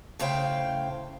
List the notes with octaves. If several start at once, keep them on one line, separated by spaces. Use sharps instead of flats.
A2 C#3 C5 F5 G5